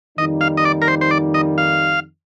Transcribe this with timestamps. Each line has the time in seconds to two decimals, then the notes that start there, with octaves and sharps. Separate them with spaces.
0.18 F2 D#3 G3 A#3 D#4 D#5
0.41 F5
0.57 D#5
0.65 D5
0.82 A#4
0.88 C5
1.01 C5
1.11 D5
1.34 D#5
1.58 F5